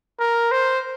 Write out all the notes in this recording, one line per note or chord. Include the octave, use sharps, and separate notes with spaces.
A#4
C5